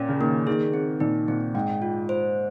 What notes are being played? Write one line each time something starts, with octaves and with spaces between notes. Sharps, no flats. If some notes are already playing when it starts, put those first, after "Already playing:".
Already playing: A#2 C#4
C#3
D#3 A#3
D#3 G#4
C4
A#2 D#4
A#2 C4
G#2 G5
F4
C5